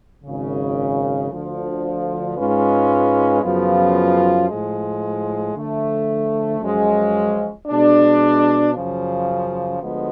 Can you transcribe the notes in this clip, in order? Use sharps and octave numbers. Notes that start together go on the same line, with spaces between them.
G#1 F#2 C#3
D2 D3 F3
G#2 G#3 C#4 F4 B4
F#2 C#3 F3 B3 F4
A2 F3 G#3
D3 F3 A3
F#2 F3 G#3 C#4
B2 G#3 D4
F#2 C#3 F3
D2 D3 F3 G#3 B3